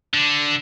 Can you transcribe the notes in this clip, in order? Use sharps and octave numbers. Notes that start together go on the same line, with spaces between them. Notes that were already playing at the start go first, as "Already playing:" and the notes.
D3